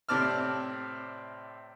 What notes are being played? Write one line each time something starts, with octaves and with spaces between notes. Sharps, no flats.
A2 C3 C4 D5 A5 F6